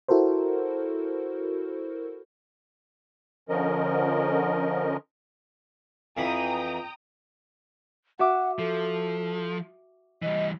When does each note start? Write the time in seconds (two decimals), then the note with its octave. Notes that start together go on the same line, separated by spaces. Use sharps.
0.08 E4 F#4 A4 A#4 C5
3.49 D3 F3 C#4 A#4 D#5
6.17 F2 E3 G5 A#5 B5 D#6
8.19 F#4 E5 F#5 D6
8.59 F3 A4
10.22 E3 G3 D#5